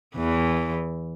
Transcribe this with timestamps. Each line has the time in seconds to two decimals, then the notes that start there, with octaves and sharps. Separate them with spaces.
0.17 E2 E3